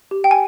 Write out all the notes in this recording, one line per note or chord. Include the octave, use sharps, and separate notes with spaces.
G4
G5
G#5